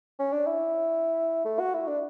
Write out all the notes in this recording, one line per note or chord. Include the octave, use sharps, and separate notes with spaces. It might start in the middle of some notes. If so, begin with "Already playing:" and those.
C#4
D4
E4
A3
F#4
E4
D4